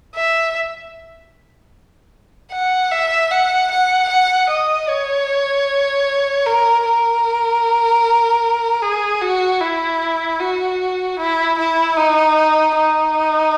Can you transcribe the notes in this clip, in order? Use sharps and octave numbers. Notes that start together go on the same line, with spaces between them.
E5
F#5
E5
F#5
F#5
F#5
D#5
C#5
A#4
A#4
G#4
F#4
E4
F#4
E4
E4
D#4
D#4